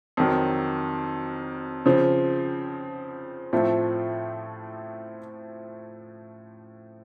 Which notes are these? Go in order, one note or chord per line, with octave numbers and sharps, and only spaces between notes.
F2 D#3 F#3
C#3 F3 C4
A2 F3 A3 C4 F4